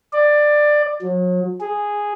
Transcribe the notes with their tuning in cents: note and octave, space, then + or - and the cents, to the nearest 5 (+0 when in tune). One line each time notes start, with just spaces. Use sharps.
D5 +15
F#3 -40
G#4 -5